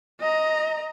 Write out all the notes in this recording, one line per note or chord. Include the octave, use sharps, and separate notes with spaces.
D#5 A#5